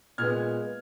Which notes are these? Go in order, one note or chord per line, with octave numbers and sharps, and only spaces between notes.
A#2 G#3 B3 F6 G#6